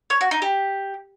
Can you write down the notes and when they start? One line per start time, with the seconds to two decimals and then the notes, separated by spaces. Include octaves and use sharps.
0.10 C#5
0.21 F#4
0.31 D#4
0.42 G4